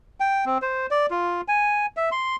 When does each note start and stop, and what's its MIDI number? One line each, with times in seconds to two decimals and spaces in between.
0.20 0.45 79
0.46 0.58 60
0.62 0.87 72
0.91 1.06 74
1.10 1.41 65
1.48 1.86 80
1.97 2.09 76
2.12 2.36 84